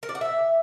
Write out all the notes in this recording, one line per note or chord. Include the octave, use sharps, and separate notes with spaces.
A#4
D5
F#5
E5